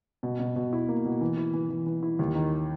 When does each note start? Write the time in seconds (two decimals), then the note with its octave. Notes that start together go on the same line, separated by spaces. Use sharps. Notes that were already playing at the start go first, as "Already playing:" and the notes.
0.23 B2
0.39 B2
0.56 B2
0.73 E4
0.89 A#3
1.05 B2
1.21 E3
1.37 E4
1.53 E3
1.70 E3
1.86 E3
2.03 E4
2.19 D#2
2.35 D#3